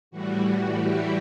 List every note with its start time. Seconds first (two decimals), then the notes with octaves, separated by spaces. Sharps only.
0.11 A2 E3 G3 F#4
0.75 G4